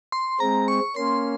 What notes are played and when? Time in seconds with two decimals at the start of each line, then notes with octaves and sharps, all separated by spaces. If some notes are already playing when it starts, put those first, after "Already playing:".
0.12 C6
0.40 G#3 C4 A#5
0.68 C#6
0.96 A#3 C#4 C6